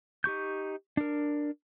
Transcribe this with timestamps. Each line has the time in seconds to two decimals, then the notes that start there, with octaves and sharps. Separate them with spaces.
0.24 D#4 G4 C#6 G6
0.97 D4 A#4